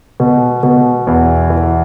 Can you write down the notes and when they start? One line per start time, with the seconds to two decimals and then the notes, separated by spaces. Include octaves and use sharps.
0.20 B2
0.63 B2
1.07 E2
1.50 E3